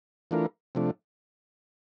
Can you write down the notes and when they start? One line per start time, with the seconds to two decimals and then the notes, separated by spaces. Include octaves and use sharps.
0.31 E3 A3 D4 F4 A#4
0.75 C3 F3 A3 D4